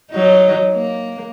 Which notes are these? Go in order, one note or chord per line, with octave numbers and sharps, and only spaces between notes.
F#3 D#4
A#3